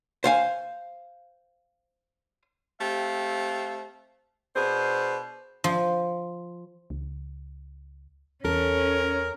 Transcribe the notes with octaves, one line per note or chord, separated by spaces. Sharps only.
C5 F5 G#5
A3 C4 G4 F5
B2 D4 G#4 C5
F3
C#2
E2 C#4 A4 A#4